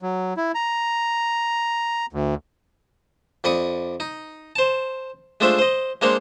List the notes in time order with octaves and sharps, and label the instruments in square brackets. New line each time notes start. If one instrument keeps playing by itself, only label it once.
[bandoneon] F#3
E4
A#5
D2
[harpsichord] F2 D5 B5 C#6 D#6
D#4
C5 A5
G#3 A3 D4 F4 C5 E5
C5 D#5
G#3 A#3 D4 C5 C#5 F5